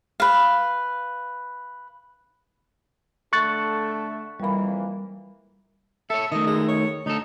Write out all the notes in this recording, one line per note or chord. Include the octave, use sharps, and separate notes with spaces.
B4 F5
D3 A3 A4 C#6 F#6 A6
F2 E3 G3 A#3 B5
A4 C#5 E5
D#3 A3 D#5
G#3
C#5
D2 D#4 A4